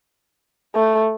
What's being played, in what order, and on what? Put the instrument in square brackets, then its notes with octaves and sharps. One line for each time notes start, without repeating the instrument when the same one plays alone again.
[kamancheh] A3